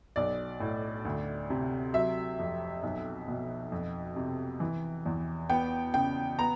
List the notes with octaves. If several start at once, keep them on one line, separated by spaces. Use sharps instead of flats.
B1 D5
A2
D2
C3
F#3 E5
F2
B1
B2
F2
C3
E3
E2
B3 G5
C#3 G5
B3 A#5